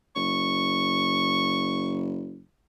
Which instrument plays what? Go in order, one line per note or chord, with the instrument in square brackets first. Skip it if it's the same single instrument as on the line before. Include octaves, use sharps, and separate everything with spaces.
[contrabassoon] F#1 [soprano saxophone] C#6